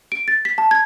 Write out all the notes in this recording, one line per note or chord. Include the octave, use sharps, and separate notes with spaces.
D7
A6
B6
A5
G#6